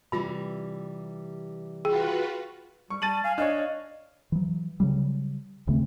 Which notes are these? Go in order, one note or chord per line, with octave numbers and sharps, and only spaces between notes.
C3 E3 G3 F4 B5
F4 F#4 G#4 B4 G5
G3 C#6
G3 A5 A6 D#7 F#7
F5 G#5
D4 C#5 D#5
E3 F#3
C#3 F#3 G3
D#1 C#3 A3 C4